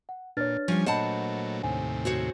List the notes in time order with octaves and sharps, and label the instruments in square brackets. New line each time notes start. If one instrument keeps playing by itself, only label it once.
[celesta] F#5
[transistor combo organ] A#2 [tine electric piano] D4 C#5 [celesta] B4 F6 A6
[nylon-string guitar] F3 G3 [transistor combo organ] C#4 G#5
[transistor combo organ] A#2 F#3 A3 [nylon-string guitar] C5 F#5 A5 [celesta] D#5 B5
[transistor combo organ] D#2 A2 C3 [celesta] G#5
[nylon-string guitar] F#4 C5 C#5